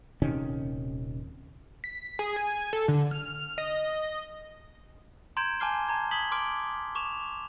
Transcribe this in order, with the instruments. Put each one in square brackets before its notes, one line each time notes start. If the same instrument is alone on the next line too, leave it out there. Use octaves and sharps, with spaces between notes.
[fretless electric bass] D#1 C3 D#3 C#4
[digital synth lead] B6
G#4
G#5
A4
D3
F6
D#5
[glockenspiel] A#5 C6 G6 G#6 D7 E7
G#5 A5 D6 F6 C7 G7
A5 A#5 G#6
D#6 G#6 B6 F#7 G7
C6 D6 F6 D7
C#6 D6 E7 F7